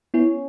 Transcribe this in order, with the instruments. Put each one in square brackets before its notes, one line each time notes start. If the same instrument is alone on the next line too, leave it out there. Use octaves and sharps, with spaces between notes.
[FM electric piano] B3 E4 [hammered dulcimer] C#4